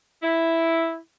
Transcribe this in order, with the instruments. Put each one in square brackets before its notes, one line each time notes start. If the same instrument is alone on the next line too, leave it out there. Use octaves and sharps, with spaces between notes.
[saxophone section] E4